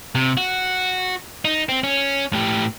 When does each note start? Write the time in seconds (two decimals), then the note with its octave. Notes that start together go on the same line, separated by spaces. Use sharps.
0.15 C3
0.37 F#4
1.45 D#4
1.69 C4
1.83 C#4
2.33 A2 G4